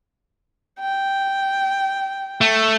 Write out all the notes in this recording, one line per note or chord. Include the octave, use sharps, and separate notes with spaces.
G5
A3